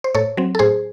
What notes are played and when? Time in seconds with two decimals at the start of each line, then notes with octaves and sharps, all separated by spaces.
0.04 C5
0.15 A2 A4 C#5
0.37 F#3 C4
0.55 A4
0.59 A2 G#4 C5